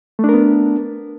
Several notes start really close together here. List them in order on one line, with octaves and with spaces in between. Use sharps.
A3 D4 A#4 B3